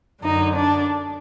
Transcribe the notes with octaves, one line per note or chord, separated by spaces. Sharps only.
F#2 D3 D#4
D4